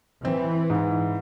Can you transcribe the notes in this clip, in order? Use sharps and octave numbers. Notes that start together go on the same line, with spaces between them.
E3 C4
G#2